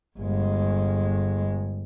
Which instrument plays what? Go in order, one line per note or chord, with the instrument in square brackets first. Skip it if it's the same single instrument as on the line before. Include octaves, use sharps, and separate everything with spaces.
[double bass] G1 G#3